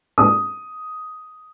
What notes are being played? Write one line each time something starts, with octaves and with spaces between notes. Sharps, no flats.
D#6